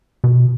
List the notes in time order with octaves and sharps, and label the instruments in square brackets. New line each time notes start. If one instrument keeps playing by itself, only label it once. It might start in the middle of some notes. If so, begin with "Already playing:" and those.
[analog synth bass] B2